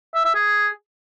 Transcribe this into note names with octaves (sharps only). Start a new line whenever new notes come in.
E5
E5
G#4